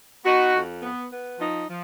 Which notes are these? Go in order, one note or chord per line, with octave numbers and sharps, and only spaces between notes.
B3 D#4 F#4
F2
B3
B3
F3 D#4
F3